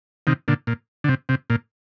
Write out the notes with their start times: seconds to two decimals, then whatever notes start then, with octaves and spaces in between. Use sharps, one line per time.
0.27 C3 D#3
0.48 A#2 D3
0.67 A#2
1.04 D3
1.08 C3
1.29 C3
1.50 A#2